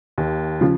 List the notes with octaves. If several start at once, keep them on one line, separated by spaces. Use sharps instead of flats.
D#2
C#3 F3